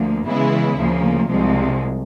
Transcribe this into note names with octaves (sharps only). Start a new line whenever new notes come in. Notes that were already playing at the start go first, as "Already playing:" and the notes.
Already playing: D2 F3 A#3
C#3 E3 G#3 B3 E4
D2 C#3 F3 A#3
C2 C3 F3 G#3